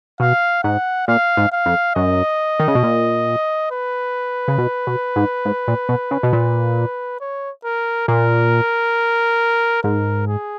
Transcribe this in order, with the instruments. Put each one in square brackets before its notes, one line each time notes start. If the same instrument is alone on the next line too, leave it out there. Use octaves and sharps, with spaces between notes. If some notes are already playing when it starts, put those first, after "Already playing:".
[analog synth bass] B2 [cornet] F5
[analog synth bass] G#2 [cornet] F#5
[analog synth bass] A#2 [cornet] F5
[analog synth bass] G#2
[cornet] F5
[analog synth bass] F2
[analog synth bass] F#2 [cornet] D#5
[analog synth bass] D#3
C#3
B2
A#2
[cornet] B4
[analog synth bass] C#3
B2
B2
G#2
G#2
A#2
B2
C#3
B2
A#2
[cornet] C#5
A#4
[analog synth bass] A#2 [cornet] A#4
[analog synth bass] G#2 [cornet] A#4
[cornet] G#4